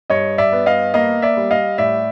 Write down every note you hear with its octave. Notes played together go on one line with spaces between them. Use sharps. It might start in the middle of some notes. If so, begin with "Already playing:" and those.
G2 C#5 D#5
D5 E5
B3
D#5 F5
A#3 D#5 F5
D5 E5
G3
D#5 F5
A2 D5 E5